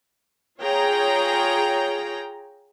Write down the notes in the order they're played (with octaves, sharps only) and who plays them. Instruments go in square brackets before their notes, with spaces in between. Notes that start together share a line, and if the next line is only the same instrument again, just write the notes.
[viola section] F4 G#4 C#5 G5 A#5